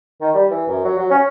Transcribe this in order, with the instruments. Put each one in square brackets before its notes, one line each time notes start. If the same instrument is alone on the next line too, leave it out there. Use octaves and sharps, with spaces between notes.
[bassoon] D#3
G3
E3
F#2
F#3
F#3
C#4